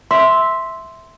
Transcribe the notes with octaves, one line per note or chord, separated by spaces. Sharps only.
E5 C6